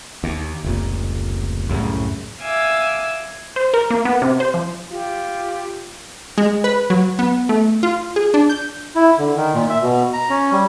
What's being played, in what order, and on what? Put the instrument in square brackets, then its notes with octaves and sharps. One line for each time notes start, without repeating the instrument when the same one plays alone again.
[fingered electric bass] D#2
F1 C#2 A#2
C2 F#2 A2 C#3
[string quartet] E5 F5 G#5 D6 E6
[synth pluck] C5
A#4
A#3
B3
C3
C5
F3
[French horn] F4 [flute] G4
[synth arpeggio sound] G#3
B4
F#3
B3
A3
F4
G#4
D4
G6
[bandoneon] E4
D3
D#3
A#2
E5
B2
A#5
C#4
G3